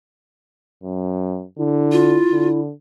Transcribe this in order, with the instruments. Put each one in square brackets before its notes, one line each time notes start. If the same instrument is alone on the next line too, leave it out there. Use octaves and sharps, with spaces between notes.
[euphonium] F#2
[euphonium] D3 [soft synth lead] E4
[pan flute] F4
[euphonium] D3